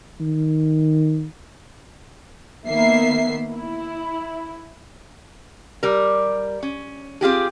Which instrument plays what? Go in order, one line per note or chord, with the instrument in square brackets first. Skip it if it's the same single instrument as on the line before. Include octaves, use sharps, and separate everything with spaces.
[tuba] D#3
[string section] D#3 A#3 B3 E5 C7
E4
[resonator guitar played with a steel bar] G3 A#4
C#4
C4 F4 G4 G#4